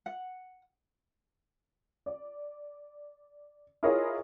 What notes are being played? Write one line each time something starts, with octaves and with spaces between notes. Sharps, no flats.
F#5
D5
E4 F4 G#4 A#4 C#5 D#5